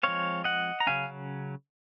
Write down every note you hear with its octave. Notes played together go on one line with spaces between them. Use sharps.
F3 G#3 C4 C#5 F5
D#5 F#5
A#5
C#3 F#3 C#4 F5 G#5